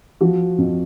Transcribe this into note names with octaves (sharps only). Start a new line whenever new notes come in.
F3 F#4
F2